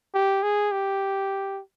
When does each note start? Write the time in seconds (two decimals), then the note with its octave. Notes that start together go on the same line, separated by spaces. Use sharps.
0.14 G4
0.43 G#4
0.72 G4